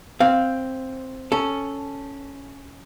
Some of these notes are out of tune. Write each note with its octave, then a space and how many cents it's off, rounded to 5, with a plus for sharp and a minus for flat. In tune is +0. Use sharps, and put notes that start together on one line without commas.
C4 +5 F5 +0
C#4 +0 A4 +0